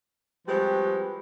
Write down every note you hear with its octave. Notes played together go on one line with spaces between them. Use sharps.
F3 G3 G#3 C4 F#4 B4